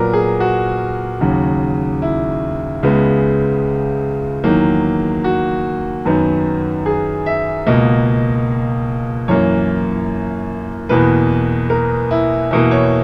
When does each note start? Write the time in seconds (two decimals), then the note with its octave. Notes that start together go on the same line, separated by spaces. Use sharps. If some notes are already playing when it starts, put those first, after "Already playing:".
Already playing: A#2 F#3 B3 A#4
0.13 G#4
0.40 F#4
1.21 D#2 C#3 F#3
2.02 E4
2.83 C#2 C#3 G#3 B3
4.44 E2 D#3 F#3 A#3
5.24 F#4
6.05 F#2 D#3 F#3 B3
6.86 G#4
7.26 E5
7.67 C#2 B2 A#3 D#5
9.28 F#2 E3 A#3 C#5
10.89 E2 B2 A#3 B4
11.70 A#4
12.11 E4
12.51 E2 B2 A#3 E4
12.71 C#5